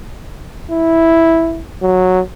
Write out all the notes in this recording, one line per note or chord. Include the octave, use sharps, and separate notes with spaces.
E4
F#3